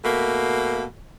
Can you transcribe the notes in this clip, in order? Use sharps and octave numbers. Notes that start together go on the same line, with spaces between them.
B2 A3 A#3